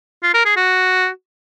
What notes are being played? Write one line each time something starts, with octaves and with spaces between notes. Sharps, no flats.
F4
A#4
G#4
F#4